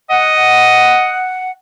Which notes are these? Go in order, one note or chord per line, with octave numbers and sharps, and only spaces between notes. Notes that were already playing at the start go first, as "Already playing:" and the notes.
D#5 F#5